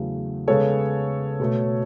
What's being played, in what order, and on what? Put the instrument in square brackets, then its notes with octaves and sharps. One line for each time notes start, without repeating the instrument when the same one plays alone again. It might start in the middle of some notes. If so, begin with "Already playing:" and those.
Already playing: [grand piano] E2 C#3 F#3 A3
C#3 G#3 B3 A4 C#5
B2 A3